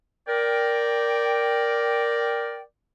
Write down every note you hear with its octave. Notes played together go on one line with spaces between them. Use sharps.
A#4 D5 G5